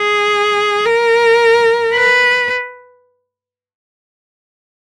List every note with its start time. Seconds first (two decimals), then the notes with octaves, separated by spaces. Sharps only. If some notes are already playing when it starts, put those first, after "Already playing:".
Already playing: G#4
0.85 A#4
1.94 B4